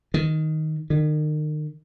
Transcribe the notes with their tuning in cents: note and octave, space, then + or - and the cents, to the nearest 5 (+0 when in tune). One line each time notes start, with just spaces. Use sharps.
D#3 +5
D#3 -35